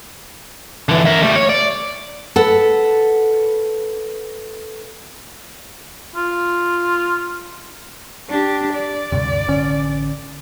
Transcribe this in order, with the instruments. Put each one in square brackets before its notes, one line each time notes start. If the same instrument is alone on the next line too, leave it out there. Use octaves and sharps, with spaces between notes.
[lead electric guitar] D3 E3
A#4 E5
G3 A3
C#5
D5
[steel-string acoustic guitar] A4 B4 F#5
[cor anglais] F4
[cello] D4 G4
D5
[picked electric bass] D2 G2 C3
A1 D3 C#4